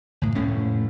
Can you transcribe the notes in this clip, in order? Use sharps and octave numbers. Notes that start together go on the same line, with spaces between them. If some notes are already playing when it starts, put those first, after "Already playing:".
C#2 A2
F1 A2 A3 C#4